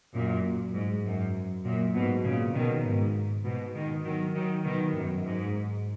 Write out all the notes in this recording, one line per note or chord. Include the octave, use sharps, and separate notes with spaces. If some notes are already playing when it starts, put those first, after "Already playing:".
F#2 A#2
G#2
F#2
F#2 A#2
G#2 B2
A#2 C#3
B2 D#3
G#2
G#2 B2
B2 D#3
D#3 F#3
D#3 F#3
B2 D#3
F#2
G#2